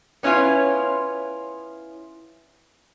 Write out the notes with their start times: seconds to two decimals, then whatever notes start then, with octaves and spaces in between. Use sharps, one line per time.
0.23 B3 C#4 E4 F4